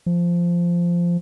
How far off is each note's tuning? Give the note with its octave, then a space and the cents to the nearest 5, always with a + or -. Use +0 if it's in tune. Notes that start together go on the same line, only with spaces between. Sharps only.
F3 -10